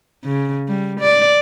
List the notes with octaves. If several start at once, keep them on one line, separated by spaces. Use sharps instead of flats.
C#3
G3
D5